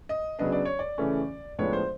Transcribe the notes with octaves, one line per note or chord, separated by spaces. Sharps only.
D#5
C#3 F#3 B3 D4 D#5
D5
C#5
D5
C#3 E3 A3 C#4
A2 F3 G#3 B3 D4 C#5
C5